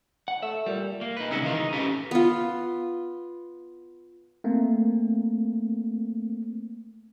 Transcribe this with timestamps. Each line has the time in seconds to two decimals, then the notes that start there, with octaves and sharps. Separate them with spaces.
0.28 F#5
0.42 A3 E5
0.66 A#2 G3
1.01 A#3
1.17 D#4 B4
1.30 C2 C#3 G#3 C#4 F#4 E5
1.42 D#3 E3 G#3 D4 F4 A#4
1.55 D#4
1.73 C#4 E4 G4 A4 B4
2.11 B3 F4
4.44 A3 A#3 C4